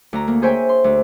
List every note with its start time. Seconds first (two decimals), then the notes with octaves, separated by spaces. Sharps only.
0.13 D2 A#5
0.28 A#3
0.42 G#4 C5 C#5 E5 G5 G#5
0.69 C6
0.84 D2